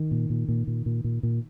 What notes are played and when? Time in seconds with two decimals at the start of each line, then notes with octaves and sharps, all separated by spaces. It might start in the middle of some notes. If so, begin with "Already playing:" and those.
Already playing: D#3
0.11 A#2
0.30 A#2
0.48 A#2
0.67 A#2
0.86 A#2
1.04 A#2
1.23 A#2